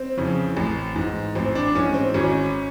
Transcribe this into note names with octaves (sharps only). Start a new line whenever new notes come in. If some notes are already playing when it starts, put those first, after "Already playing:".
Already playing: C4
F2 C#3 E3
A1
G#2 E3
A1 C4
D4
G#2 E3 C#4
C4
G#1 C#4